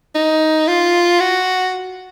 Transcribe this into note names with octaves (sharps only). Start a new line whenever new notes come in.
D#4
F4
F#4